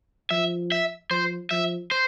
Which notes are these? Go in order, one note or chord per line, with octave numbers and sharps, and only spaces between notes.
F3 E5
E5
F3 C5
F3 E5
C5